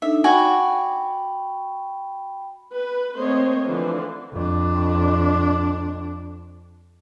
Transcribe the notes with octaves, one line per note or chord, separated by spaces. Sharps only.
D4 D#4 A4 E5
F#4 D5 G5 G#5 B5
B4
A3 A#3 C4 C5 C#5 D#5
D3 E3 F3 B4 C5
F2 D4